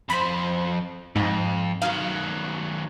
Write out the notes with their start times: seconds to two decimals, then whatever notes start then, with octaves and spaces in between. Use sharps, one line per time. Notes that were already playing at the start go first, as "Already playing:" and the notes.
0.10 F2 C5 B5
1.16 F2 G#2
1.82 D#3 F#3 F5